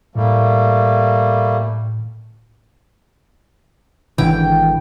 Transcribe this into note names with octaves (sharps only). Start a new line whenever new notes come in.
A2 G3 A3 A#3
G#1 D3 E3 G5